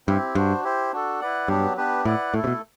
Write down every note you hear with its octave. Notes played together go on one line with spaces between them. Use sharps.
G2 C4 E4 G4
G2 D4 F#4 C5
E4 G4 C5
D4 F#4 A4
E4 B4 D5 F#5
G2 F#3 B3 D4 G4
B3 D4 G4 B4
A2 E4 B4 D5 F#5
A2 A3 E4 A4
C3
B2